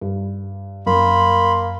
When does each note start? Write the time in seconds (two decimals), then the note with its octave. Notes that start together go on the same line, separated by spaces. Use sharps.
0.01 G2
0.86 F#2 A#3 B5 C6